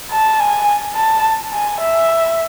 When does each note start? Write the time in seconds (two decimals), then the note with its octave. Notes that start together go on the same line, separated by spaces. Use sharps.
0.11 A5
0.39 G#5
0.96 A5
1.53 G#5
1.80 E5